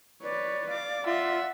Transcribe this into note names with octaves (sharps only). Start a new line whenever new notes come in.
B4 C#5 D5
F5 D6
F4 E5 F#5